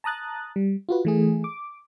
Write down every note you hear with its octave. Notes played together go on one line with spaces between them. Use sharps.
A5 A#5 D#6 F#6 A6
G3
F4 F#4 B4
E3 A3 G#4
D6